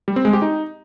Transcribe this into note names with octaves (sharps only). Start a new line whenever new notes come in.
G3
C4
G#3
G4
D#4